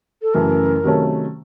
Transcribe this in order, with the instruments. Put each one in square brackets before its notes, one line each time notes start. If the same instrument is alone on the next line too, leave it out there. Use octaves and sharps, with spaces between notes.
[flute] A4
[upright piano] F#2 C#3 E3 A3 [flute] A#4
[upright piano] C3 D#3 F#3 A3 C#4